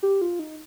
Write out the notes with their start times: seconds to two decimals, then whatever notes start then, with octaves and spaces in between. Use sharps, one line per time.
0.03 G4
0.21 F4
0.39 D#4